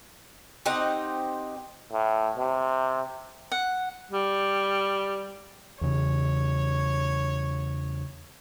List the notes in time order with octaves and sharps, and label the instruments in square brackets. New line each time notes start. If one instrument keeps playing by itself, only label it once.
[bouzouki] C4 D#4 G4 F#5
[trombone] A2
C3
[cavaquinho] F#5
[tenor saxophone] G3
[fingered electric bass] E2 C#3 [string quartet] C#5